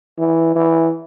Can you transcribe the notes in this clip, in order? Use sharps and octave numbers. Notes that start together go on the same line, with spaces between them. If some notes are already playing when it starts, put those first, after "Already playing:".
E3
E3